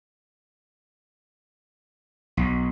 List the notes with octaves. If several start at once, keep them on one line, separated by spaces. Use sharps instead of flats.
B1